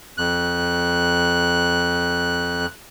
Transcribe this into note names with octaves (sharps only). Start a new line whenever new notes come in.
F2 F#6